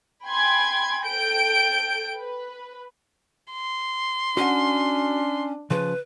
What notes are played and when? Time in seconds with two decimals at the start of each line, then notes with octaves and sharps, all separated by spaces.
0.24 G5 G#5 B5 C6 G#6
1.03 A4 G5 G6 D7
2.17 B4
3.53 C6
4.37 C#4 D4 F#4 F#5
5.70 C#3 F3 B4